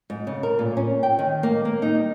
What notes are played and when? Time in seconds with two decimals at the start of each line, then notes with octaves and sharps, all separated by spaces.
0.10 G#2
0.27 C#3
0.43 A#4
0.59 A#2
0.77 C#4
1.03 G5
1.19 D#3
1.43 A#3
1.65 A#3
1.82 D#4
1.95 G3